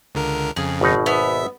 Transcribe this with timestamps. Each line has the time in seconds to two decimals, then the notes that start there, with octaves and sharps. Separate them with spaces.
0.15 C#2 D3 A#4
0.56 F2 C#3 G#4
0.81 G#1 B2 D#4
1.06 B3 E5